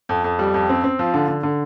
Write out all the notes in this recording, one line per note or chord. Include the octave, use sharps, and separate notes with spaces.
F2
F2
G3
F2
C4
C4
F3
D3
D3
D3